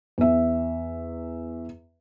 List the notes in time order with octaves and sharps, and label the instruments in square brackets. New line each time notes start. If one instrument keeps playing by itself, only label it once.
[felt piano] E2 E5